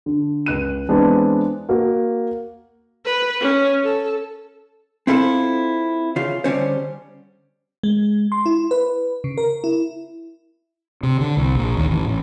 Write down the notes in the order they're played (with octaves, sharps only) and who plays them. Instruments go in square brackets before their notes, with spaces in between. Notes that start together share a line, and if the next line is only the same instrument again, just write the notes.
[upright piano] D3
C#2 F#6 D#7
E3 G#3 B3 C4 D4
A#3 F#4
[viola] B4
C#4
A4
[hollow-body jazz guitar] C4 E4 F4 A4 C5
C#3 F4
D3 G3 C#4 C5
[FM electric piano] G#3
C6
E4
B4
C#3
A#4
E4
[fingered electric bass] C3
D3
C2
A#1
D#2
A1
A1